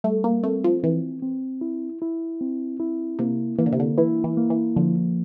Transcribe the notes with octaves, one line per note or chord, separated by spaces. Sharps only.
G3 A3
A#3
A3 C4
F3
E3 C4
C4
E4
E4
C4
E4
C3 A#3
E3 A#3
D3
C3
D3
E3 E4
E3
A#3
E3
D3 F3